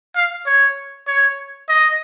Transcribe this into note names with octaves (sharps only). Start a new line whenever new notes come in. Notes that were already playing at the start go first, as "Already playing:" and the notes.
F5
C#5
C#5
D#5